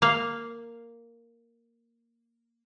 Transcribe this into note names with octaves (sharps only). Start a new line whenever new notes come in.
A#3 F5